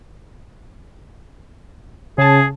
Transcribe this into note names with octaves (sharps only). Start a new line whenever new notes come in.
C#3 G#4 A5